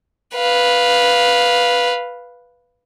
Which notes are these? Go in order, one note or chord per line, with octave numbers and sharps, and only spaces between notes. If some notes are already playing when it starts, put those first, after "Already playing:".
B4 F5